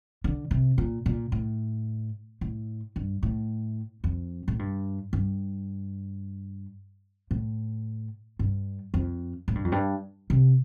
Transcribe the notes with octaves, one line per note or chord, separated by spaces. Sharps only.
D3
C3
A#2
A#2
A2
A2
G2
A2
F2
A2
G2
G2
A2
G2
F2
A2
G2
F2
G2
C3